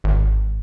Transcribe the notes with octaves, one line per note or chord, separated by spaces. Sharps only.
G#1